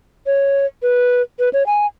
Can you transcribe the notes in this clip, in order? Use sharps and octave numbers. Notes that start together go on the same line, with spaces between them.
C#5
B4
B4
C#5
G#5